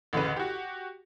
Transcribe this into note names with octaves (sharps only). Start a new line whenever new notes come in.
A1 D2 C#3 B4
F#4 G4